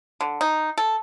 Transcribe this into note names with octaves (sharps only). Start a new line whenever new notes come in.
D3
D#4
A4